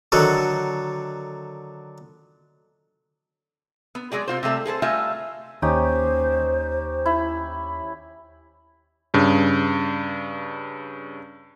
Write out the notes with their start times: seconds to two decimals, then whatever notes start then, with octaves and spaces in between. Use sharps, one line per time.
0.12 D3 D#3 F#3 F#4 A4
3.95 B3
4.12 F#3 G#3 G#4 D5
4.28 C3 F4 C5
4.43 C3 G3 A3 E5
4.66 G#4 A4 B4 C5
4.82 G3 A3 F4 D#5 E5 G#5
5.62 D#2 C#4 D#4 G4 C5
7.06 E4
9.14 G2 C#3